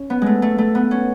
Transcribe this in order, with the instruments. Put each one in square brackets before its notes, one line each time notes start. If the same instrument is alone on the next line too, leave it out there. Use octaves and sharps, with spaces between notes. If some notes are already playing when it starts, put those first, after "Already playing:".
Already playing: [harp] C#4
B3
G#3 A3
A3
A3
B3
C#4